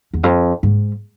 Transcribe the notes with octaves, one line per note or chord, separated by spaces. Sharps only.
E2
F2
G#2